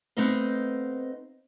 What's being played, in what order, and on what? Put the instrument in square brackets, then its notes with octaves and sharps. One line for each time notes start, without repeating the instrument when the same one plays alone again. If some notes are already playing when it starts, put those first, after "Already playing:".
[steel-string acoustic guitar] A3 B3 C4 D#4 D#5 F5